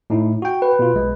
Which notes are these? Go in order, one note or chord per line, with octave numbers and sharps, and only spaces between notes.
A2 D#4 E4
F#4 G5
B4
B2 F4
B1 G#3